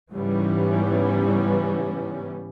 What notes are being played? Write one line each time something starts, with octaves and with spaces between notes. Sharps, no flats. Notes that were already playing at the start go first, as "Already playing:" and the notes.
G#2 C#3 E3 G3 B3 C#4